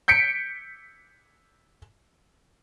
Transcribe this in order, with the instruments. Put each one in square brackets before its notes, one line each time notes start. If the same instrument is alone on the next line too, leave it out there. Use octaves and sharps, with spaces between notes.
[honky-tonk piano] G6 B6 C#7 D7